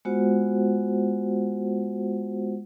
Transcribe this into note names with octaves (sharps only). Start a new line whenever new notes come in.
G#3 B3 F4 F#4 C5 F#5